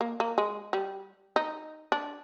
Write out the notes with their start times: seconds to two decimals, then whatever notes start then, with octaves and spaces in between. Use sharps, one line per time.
0.01 A#3
0.20 A#3
0.38 G#3
0.73 G3
1.36 D#4
1.92 D4